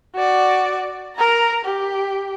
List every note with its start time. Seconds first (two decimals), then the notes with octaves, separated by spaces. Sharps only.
0.15 F#4 D5
1.15 A#4 A#5
1.65 G4